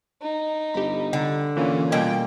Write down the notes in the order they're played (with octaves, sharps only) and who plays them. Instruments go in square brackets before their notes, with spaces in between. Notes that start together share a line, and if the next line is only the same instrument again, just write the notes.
[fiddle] D#4
[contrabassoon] G1 [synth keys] G4 B5
[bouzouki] D3
[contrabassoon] A#2 [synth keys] E3 [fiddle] C#4
[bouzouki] B2 A#3 G#5 [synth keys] G3 D#5 [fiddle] G5